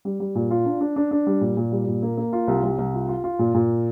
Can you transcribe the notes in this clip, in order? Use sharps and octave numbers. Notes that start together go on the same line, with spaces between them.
G3
G3
A#2
F4
D4
D4
D4
D4
G3
A#2
A#2
G3
A#2
A#3
A#3
F4
C2
C2
C2
F4
F4
F4
A#2
A#2